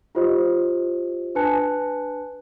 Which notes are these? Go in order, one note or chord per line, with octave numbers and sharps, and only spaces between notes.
E4 F4 G4 C5 D#5
D4 B4 G#5 A5 F#6 C#7